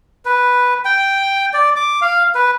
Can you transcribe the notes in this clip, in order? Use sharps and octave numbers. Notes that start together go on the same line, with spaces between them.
B4
G5
D5
D6
F5
B4